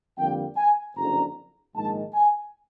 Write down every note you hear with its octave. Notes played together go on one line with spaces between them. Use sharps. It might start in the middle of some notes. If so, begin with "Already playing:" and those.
F2 D3 G3 A#3 G5
G#5
F#1 F2 D3 A#5
A#1 G#2 D#3 G#3 A5
G#5